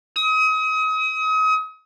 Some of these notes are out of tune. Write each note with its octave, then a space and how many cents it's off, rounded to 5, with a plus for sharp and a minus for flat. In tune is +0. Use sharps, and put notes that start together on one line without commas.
D#6 +35